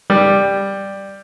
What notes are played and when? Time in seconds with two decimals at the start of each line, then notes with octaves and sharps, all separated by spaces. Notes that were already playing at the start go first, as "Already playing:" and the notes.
0.10 G3